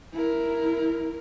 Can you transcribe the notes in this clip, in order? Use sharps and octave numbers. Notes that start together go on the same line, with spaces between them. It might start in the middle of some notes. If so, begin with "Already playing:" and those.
E4 A#4